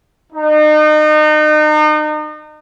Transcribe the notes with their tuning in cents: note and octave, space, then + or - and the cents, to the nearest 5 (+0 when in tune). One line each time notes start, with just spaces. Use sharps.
D#4 -35